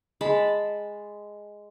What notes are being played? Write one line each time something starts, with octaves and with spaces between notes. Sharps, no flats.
G#3 A5 B5